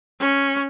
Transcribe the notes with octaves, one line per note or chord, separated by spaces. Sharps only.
C#4